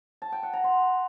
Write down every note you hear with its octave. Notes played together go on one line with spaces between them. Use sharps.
A5
G5
F#5
A#5
C6